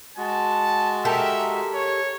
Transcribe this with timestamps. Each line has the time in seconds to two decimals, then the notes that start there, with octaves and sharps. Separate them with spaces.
0.17 G#3 F#4 A5
1.05 G4 A4 A#4 E5
1.74 C#5